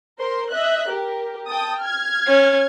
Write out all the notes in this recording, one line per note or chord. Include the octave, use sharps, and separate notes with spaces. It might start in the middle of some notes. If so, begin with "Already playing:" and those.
A#4 C5 C6
D#5 E5 F#6
G4 A#4
G5 A5 D#6
F6 G#6
C#4